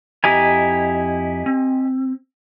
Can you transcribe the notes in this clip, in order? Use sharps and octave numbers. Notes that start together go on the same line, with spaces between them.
F2 E4 G4 D#5 G#5 A#5
C4